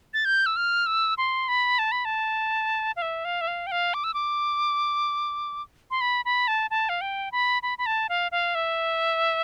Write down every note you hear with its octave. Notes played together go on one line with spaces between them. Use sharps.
A6
G6
E6
F6
E6
C6
B5
A5
B5
A5
F5
E5
F5
E5
F5
G5
F5
D6
E6
D6
C6
B5
B5
A5
A5
F5
G5
B5
B5
B5
A5
F5
F5
E5